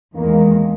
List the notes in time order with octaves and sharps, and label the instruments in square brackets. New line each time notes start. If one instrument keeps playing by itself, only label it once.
[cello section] E2 D#3 G#3 [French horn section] A#3